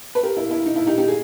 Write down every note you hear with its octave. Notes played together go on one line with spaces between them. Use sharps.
B4
G4 A#4
E4
E4
D#4
E4
D#4 G4
D#4 G4
G#4